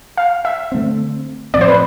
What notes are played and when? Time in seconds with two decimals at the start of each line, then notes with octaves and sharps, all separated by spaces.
0.17 F5
0.45 E5
0.72 D3 A3 C4
1.54 A2 F3 C4 D5
1.61 C5
1.68 B4